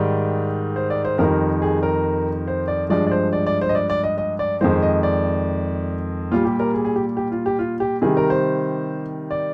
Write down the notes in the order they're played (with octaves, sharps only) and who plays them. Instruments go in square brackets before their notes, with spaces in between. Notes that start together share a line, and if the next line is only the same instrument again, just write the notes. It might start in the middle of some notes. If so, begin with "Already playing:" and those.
Already playing: [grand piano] G#2 D#3 G3 D5
C5
D5
C5
F2 D#3 G3 A#4
G#4
A#4
C5
D5
G2 F3 G#3 D5
D5
C5
D5
D5
C5
D#5
D5
D5
D#5
D#5
D5
F2 D#3 G#3 C5
D#5
D5
A#2 G3 F4
G4
A#4
G#4
G#4
G4
G4
F4
G4
F4
G4
C3 D#3 G3 G#4
A#4
C5
D5